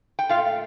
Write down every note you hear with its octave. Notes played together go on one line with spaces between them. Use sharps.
G5
A#2 A3 F4 F5